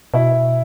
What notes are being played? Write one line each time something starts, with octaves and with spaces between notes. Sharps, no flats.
B2 E4